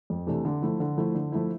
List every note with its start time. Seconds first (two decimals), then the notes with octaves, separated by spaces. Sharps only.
0.10 F2
0.27 C3 E3 A3 D4
0.45 D3
0.62 F3 A3 E4
0.80 D3
0.97 F3 A3 E4
1.15 D3
1.32 F3 A3 E4